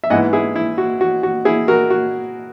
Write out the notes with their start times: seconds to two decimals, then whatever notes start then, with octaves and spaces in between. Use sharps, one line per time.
0.04 E5
0.10 G#2 E3 B3 E4 D#5 F#5
0.33 E4 G#4
0.56 E4
0.78 F#4
1.01 F#4
1.23 F#4
1.45 E4 G#4
1.68 F#4 A#4
1.90 F#4